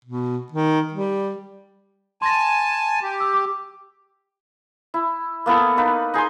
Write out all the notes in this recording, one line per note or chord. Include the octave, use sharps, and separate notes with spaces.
B2
D#3
G3
G#5 A5 C6 A#6
G4
E6
D6
E4
A#3 B3 E4 A4
A#3 D#4 B4
D#4 G#4 G#5 C6